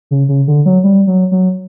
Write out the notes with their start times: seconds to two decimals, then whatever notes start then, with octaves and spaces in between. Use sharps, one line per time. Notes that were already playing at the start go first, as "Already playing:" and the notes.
0.11 C#3
0.28 C#3
0.47 D3
0.66 F#3
0.84 G3
1.07 F#3
1.32 F#3